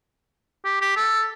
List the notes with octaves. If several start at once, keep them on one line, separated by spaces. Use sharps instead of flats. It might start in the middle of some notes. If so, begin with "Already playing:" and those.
G4
G4
A4